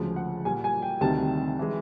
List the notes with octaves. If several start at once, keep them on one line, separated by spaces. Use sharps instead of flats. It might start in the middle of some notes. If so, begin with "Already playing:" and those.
Already playing: D2 C#3 F3 G#3
F#5
A#2 G3 G#5
G#5
G5
D2 C3 D#3 G3 A5
E3 G#3